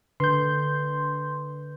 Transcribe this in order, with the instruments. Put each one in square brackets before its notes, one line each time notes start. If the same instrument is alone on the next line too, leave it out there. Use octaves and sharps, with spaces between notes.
[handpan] D3 [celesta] B4 [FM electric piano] C6 G6